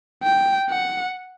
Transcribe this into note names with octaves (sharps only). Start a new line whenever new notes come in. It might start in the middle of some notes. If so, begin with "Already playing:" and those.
G5
F#5